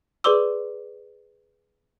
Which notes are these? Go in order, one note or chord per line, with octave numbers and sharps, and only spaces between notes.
G#4 B4 D5 C6 D6 E6